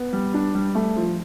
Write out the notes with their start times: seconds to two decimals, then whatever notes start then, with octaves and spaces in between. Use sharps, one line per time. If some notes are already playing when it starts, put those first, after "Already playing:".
Already playing: B3
0.13 G3
0.34 D4
0.55 G3
0.75 A3
0.96 F3